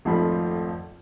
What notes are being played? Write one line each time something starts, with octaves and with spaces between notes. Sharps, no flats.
G#1 F2 F3 A3 F4 B5